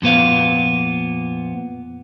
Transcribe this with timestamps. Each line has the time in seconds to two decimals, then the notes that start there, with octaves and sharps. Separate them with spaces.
0.02 F2 A#2 B3 F5